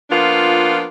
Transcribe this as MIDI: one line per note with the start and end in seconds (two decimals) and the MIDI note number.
0.10 0.85 53
0.10 0.85 58
0.10 0.85 59
0.10 0.85 62
0.10 0.85 65